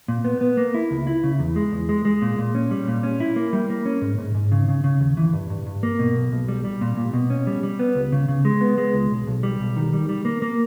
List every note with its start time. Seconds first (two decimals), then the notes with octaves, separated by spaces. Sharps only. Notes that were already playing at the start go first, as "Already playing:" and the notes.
0.08 A#2
0.24 B3
0.41 B3
0.57 A#3
0.74 E4
0.91 C#2
1.07 E4
1.24 C#3
1.40 E2
1.56 G#3
1.72 E2
1.89 G#3
2.05 G#3
2.22 A#2
2.38 A#2
2.55 C#4
2.71 G3
2.88 A#2
3.03 C#4
3.20 E4
3.36 A#3
3.53 G3
3.70 A#3
3.86 C#4
4.02 G#2
4.18 G#2
4.35 G#2
4.52 C#3
4.68 C#3
4.84 C#3
5.01 D#2
5.17 E3
5.33 G2
5.50 G2
5.67 G2
5.83 A#3
5.99 B2
6.16 B1
6.32 B1
6.48 G3
6.64 G3
6.81 A#2
6.97 A#2
7.13 B2
7.30 C#4
7.47 G3
7.63 G3
7.79 B3
7.95 C#2
8.12 C#3
8.28 C#3
8.45 G#3
8.61 B3
8.78 G#3
8.94 C#2
9.11 B1
9.27 B1
9.43 G3
9.60 B1
9.76 D#3
9.93 G3
10.09 G3
10.25 A#3
10.42 A#3